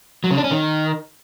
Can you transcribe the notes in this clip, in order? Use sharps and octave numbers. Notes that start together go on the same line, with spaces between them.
F#3
C#3
D4
C#4
D#3